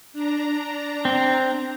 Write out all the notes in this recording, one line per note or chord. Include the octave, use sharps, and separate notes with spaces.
D4 A#5
C4